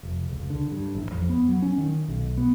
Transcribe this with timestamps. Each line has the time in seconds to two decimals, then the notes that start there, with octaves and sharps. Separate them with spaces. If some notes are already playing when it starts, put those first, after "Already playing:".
0.03 F1
0.31 C#2
0.50 D3
0.71 G2
0.95 A1
1.12 F2
1.29 B3
1.48 F#3
1.62 C#4
1.78 D#3
2.08 B1
2.37 B3